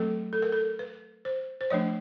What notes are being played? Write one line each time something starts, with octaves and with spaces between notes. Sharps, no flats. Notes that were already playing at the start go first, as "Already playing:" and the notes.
Already playing: F#3 A3 C4 A4
A4
A#4
A4
B4
C5
C5
F3 A3 D4 C#5